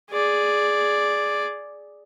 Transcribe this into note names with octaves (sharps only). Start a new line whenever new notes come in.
G#4 D5